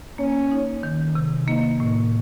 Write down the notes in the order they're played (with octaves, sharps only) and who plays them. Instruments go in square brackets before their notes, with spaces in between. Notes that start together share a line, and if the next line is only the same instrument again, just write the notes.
[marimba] A#3 [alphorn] C#4
[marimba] D#4
D#3
C3
[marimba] A#3 [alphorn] D#4
[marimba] A2